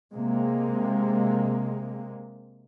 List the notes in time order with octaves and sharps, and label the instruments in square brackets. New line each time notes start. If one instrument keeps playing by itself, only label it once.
[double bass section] C3 G#3 A#3